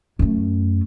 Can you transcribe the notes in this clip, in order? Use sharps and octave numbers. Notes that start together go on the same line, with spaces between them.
F#2 A3